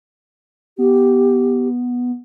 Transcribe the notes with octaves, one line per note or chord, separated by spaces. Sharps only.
B3 G4